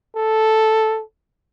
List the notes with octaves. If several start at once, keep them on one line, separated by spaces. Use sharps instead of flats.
A4